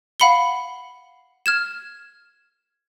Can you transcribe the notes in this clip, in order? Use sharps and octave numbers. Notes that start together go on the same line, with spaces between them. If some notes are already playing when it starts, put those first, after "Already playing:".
F5 F#5 B5 C#7 G7
F6 G#6 E7